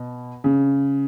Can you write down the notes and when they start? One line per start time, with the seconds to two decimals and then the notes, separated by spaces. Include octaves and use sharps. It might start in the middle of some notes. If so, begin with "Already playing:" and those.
Already playing: B2
0.44 C#3